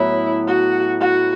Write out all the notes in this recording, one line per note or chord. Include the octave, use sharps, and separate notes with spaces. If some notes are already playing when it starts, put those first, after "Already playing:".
Already playing: A2 F#3 B3 E4
F#4
F#4